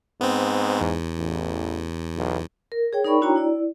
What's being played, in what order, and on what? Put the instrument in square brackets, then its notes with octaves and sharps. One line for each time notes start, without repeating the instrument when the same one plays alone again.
[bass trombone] G#2 [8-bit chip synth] B3 C4
[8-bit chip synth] E2
[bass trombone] A1
B1
[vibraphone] A#4
G#4 C#5 G5
D#4 A#4 D5 G5 B5 C#6
D4 E4 F#4 C#5 G5 A#5
E4 D5